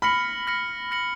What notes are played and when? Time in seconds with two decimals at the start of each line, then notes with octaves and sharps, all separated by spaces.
0.02 B5 F6 A#6 C#7 F#7
0.47 F6 A#6 C#7 F#7
0.91 F6 A#6 C#7 F#7